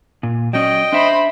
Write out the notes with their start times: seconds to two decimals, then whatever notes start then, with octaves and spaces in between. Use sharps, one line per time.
0.23 A#2
0.53 F#3 C#4 D5 D#5 G5
0.93 D4 C5 E5 B5